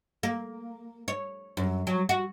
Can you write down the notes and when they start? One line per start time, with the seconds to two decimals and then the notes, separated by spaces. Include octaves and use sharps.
0.23 A#3
1.08 C#5
1.57 F#2
1.87 F#3
2.09 F#4